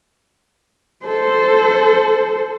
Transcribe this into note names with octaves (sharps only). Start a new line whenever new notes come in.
A4 C5